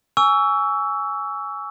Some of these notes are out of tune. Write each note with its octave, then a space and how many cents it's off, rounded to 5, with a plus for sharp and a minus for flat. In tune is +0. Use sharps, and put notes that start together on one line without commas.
G#5 +0 C#6 +30 E6 +0